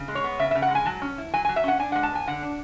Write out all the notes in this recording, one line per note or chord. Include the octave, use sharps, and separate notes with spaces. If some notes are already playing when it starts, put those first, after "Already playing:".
Already playing: C#3
G#3
C#5
B3
C#3 E5
C#3 E5
F#5
G#3 G#5
F#3 A5
C#4
E4
F#3 G#5
F#3 G#5
E5
C#4 F#5
D4 G#5
G#3 F#5
A5
B3 G#5
D3 F#5
D4